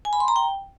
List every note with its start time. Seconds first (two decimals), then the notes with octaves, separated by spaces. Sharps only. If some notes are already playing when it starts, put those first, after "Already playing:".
0.05 G#5
0.13 B5
0.20 C6
0.28 A#5
0.36 G5